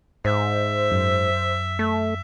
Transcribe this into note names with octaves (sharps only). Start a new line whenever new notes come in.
G#2 C5 E5
F#2
A3